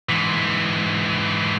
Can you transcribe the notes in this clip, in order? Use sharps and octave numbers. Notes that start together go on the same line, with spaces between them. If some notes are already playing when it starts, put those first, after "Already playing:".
G#2 E3